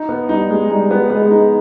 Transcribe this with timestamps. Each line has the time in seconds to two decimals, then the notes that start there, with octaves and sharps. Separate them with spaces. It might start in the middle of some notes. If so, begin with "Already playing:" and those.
Already playing: D#4
0.09 B3
0.29 G3 D#4
0.50 G#3
0.70 G3 D#4
0.91 B3
1.10 G#3 B3
1.31 D#4